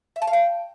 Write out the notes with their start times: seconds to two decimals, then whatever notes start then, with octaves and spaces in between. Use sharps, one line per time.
0.16 E5
0.22 A5
0.27 F5
0.33 G5